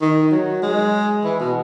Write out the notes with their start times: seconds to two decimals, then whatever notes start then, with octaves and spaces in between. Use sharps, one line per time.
0.02 D#3
0.32 F#3
0.63 G#3
1.25 E3
1.40 B2